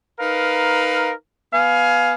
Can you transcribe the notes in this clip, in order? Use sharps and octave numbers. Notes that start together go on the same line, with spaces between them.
D#4 A#4 B4 F5
B3 F5 G#5